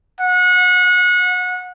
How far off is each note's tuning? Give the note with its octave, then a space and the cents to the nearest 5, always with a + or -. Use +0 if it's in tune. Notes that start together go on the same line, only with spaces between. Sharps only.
F#5 -30